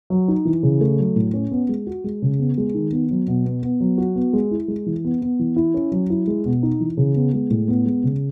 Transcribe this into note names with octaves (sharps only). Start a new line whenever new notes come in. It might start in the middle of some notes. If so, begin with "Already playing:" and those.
F#3
D#4
E3
C#3
A3
F#3
A2
C#4
B3
G#3
F#4
G#3
C#3
B3
G#3
D#3
B3
F#3
B2
B3
B3
F#3
F#4
B3
G#3
E4
G#3
E3
B3
B3
E3
E4
C#4
F#3
E4
G#3
B2
D#4
E3
C#3
B3
G#3
A2
B3
G#3
C#3